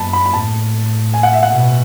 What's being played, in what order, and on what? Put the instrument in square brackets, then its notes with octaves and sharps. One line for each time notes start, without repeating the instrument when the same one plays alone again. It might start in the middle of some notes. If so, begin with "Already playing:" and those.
Already playing: [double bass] F#2 [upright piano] A5 B5
[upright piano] B5
B5
[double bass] A2 [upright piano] A5
[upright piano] G#5
F#5
E5
F#5
[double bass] B2